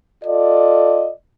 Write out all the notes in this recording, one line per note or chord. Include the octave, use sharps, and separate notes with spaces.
F4 A4 D5 D#5